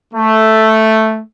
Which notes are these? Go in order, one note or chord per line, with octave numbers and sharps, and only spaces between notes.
A3